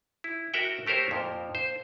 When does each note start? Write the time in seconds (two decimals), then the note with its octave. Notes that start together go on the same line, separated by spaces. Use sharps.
0.24 E4
0.54 F#4 A#4 E5 F#5 G5
0.86 A3 G4 A#4 C5 C#5
1.11 F2 A#2 F3
1.55 C5